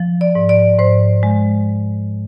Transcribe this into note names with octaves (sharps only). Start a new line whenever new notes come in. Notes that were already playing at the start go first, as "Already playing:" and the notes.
Already playing: F3
D5
G#2
D5
G#2 C5
G#3